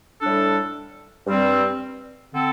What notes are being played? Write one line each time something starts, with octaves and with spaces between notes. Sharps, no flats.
A2 G3 D4 A4
G2 G3 C4
D3 C4 A4